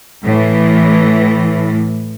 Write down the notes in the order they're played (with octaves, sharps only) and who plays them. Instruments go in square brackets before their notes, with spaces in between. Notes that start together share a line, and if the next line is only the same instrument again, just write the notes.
[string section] A2 E3